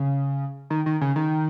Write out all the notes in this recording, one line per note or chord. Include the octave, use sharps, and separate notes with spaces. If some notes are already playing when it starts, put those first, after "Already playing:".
Already playing: C#3
D#3
D#3
C#3
D#3